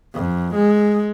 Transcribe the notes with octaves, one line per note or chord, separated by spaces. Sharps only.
F2
G#3